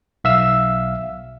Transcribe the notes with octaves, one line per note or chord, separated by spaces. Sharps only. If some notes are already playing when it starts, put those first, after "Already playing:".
B1 E5 F5 E6